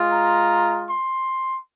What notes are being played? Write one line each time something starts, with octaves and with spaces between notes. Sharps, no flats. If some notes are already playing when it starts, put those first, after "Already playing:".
Already playing: G#3 F4
A#5
C6